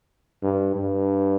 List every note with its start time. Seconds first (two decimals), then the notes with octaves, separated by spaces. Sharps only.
0.42 G2
0.75 G2